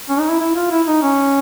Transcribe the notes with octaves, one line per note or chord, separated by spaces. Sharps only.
C#4
D#4
E4
E4
F4
E4
D#4
C#4